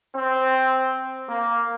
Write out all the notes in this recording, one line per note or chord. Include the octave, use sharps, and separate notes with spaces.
C4
A#3